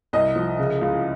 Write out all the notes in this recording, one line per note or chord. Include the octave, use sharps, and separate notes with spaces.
C2 D#5
F3
C#3
C#2